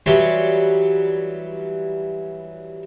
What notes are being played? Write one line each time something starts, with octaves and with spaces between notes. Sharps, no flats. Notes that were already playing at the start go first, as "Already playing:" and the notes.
E3 F#3 G3 C#5 C6